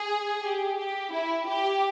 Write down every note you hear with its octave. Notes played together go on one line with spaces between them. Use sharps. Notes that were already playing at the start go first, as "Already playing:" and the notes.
Already playing: G#4
G4
G4
E4
G4